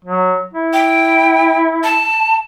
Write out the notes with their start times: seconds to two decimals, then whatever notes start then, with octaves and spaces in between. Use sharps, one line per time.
0.05 F#3
0.53 E4
0.73 G5
1.84 A5